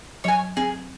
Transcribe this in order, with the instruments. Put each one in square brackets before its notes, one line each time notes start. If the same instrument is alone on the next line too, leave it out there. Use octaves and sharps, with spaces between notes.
[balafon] F#3 [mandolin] C#5 G#5
[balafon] C4 [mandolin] G#4